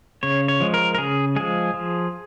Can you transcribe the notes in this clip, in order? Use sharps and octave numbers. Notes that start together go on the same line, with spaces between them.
C#3 C#5
C#5
F3 G#3
A#4
A#4
C#3 G#4
F3 G#3 G#4
F3